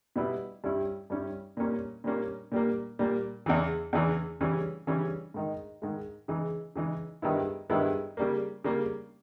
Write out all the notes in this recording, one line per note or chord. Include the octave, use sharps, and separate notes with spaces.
B2 G3 B3 E4
G2 G3 C#4 E4
G2 G3 C#4 E4
A#2 G3 A#3 C#4
A#2 G3 A#3 C#4
A#2 G3 A#3
A#2 G3 A#3
E2 C#3 E3
E2 C#3 E3
C#3 E3 G3 C#4
C#3 E3 G3 C#4
G#2 D#3 G#3 D#4
G#2 D#3 G#3 D#4
C#3 E3 G#3 D#4
C#3 E3 G#3 D#4
G2 D#3 G#3 B3 E4
G2 D#3 G#3 B3 E4
C#3 G3 A#3
C#3 G3 A#3